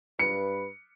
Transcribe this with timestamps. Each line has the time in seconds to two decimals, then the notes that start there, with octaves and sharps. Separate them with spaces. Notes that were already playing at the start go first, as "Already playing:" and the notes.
0.19 G2 B4 C#7